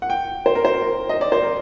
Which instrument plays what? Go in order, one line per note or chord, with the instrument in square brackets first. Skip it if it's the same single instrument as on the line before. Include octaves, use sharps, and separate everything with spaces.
[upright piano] F#5
G5
C5
A#4
C5
A#4
D#5
D5
C5
A#4